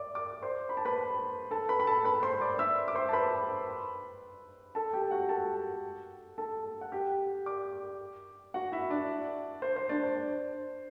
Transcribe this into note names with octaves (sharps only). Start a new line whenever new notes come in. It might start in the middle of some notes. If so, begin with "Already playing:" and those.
Already playing: D5 E5 D6
D5 D6
C5 C6
B5
A5
B4 B5
A4 A5
B4 B5
B5
A4 A5
B4 B5
C5 C6
D5 D6
E5 E6
D6
C5 C6
A5
B4 B5
A4 A5
G4 G5
F#4 F#5
A4 A5
A4 A5
F#5
G4 G5
D5 D6
F#4 F#5
E4 E5
D4 D5
C5
C5
D4 D5
C5